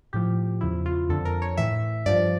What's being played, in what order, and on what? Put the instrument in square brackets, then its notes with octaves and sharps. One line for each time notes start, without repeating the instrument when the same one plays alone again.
[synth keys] A2 F3 G4
E2 C#3 F3 E4
F4
F2 D3 F3 A4
A#4
C#5
A2 E3 E5
G2 F3 D5